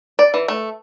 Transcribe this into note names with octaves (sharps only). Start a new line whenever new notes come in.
D5
E3
A3